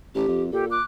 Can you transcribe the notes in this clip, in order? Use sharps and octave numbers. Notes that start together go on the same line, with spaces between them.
A1 G4
F2
A#2 G4 A4
D6 F#6